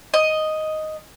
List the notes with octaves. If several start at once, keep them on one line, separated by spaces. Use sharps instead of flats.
D#5